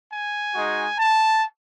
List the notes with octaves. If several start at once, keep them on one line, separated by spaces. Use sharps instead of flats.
G#5
G#3 D#4 F#4
A5